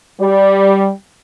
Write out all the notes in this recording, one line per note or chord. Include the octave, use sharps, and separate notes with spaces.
G3